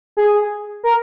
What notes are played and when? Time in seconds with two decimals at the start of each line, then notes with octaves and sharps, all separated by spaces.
0.17 G#4
0.84 A#4